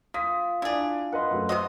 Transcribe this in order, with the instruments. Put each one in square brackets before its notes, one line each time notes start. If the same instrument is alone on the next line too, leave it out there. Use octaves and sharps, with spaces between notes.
[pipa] A#3 [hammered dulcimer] F4 [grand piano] D#6 B6
[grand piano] D4 D5 [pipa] E4 G#4
[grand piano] A#4 B4 D#5 [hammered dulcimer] F#5 C6
[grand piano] F#2 A3
[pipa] C3 C5 D#5 [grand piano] F#4